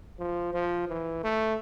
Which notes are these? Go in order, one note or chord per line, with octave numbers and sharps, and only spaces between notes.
F3
F3
E3
A3